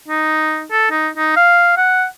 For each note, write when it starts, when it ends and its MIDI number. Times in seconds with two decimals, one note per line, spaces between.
0.08 0.65 63
0.71 0.89 69
0.91 1.09 63
1.17 1.35 63
1.36 1.72 77
1.77 2.05 78